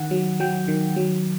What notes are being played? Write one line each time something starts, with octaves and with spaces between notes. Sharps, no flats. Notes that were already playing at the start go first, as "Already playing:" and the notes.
Already playing: D#3 F#5
F#3
F#3 G5
D#3
F#3